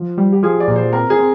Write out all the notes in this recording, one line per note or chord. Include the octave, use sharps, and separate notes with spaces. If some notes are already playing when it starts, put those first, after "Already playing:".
Already playing: F3
G3
G4
F3 G#4
D5
A#2
C5
C4 A#4
G#4
C4